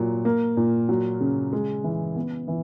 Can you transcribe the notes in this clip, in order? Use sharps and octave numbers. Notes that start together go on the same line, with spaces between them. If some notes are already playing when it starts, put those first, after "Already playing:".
Already playing: A#2 F#3
A#3
A#2
F#3
C#3
G#3
E3
B3
E3